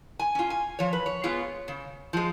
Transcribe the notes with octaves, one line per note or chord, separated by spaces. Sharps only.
G#5
C#4 F4
G#5
F3 C#5
B4
C#5
G#3 B3 F4
C#3
F3 G#3